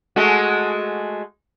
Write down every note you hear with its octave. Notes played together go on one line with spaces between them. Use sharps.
G#3 A3 F#4